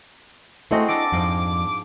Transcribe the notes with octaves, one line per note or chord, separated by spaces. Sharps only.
G#3 A3 C4 E4 F#4 C5 D#5
D4 A4 A#5 D6
F2 G#2 F3